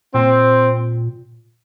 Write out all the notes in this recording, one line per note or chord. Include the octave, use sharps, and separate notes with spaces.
A#2 C4